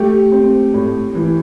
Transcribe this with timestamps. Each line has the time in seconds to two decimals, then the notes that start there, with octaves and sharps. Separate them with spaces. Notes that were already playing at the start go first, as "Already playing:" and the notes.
Already playing: A3 G4
0.32 C4
0.74 A2
1.15 E3